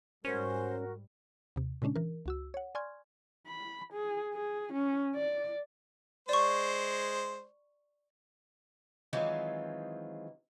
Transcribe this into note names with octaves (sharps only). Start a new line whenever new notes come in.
G#2 G3 C#4 F#4 A#4 C5
D#2 C3
A#2 C#3 G#3 C#4 D4
E3 A#4
C#2 F#4 E6
C#5 F#5
D5 G#5 C6 C#6 F6 G#6
B5
G#4
G#4
C#4
D5
G#3 C5 D5 C#6
D#3 E3 F#3 G#3 C4 F4